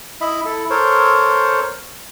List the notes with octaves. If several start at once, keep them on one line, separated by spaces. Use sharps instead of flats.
E4 D#5 E5 B5
E4 A4
A4 A#4 C5 C#5